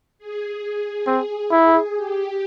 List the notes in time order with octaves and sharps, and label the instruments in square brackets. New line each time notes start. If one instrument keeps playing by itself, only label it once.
[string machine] G#4
[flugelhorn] C4 [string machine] G#4
[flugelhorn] E4
[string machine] G4